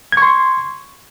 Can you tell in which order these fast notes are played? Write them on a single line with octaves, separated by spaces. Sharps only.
G#6 C#6 C6